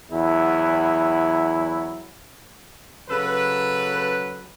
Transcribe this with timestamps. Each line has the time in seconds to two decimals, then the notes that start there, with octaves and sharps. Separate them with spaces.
0.11 E2 F#3 E4
3.10 C#3 F#3 A4 B4